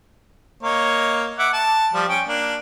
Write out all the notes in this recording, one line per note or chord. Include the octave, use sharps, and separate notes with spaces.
A#3 C#5 D#5
E5 F#5 D6
A5
F3 G3
C#4 G5
A#3 D4